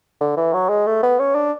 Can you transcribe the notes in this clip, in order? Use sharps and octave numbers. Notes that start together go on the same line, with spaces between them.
D3
E3
F#3
G#3
A3
B3
C#4
D4